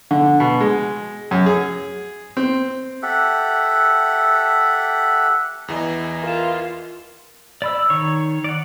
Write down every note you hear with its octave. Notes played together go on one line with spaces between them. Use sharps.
D3
B2
G#3
F#2
G#4
C4
G4 A4 E5 F#5
E2 E3 D#5
F4 A#4 E7
D5 B5 E6
D#3 C#5
D5 F#5